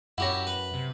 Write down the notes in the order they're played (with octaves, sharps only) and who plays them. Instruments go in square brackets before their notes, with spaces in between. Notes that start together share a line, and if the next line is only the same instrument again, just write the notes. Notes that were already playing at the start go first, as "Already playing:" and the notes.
[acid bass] F#2 [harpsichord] E4 G4 C#5 [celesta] F#5 A#6
[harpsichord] B4
[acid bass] C3